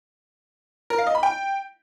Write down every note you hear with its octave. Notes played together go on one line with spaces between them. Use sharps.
A#4
F5
D#5
B5
G5